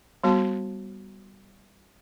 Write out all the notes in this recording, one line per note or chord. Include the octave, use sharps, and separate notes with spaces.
G3 B3 F#4 A5